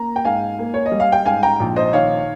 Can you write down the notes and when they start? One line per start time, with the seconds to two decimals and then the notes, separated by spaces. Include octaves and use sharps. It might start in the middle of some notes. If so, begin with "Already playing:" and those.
Already playing: A#3 A#5
0.16 G5
0.25 G#2 F5 G#5
0.59 A#3
0.74 C#5
0.86 D#5
0.92 G3
1.00 F5
1.12 G5
1.25 G#2 F5 G#5
1.43 G5 A#5
1.60 A#1
1.76 C5 D#5
1.93 D#3 C#5 F5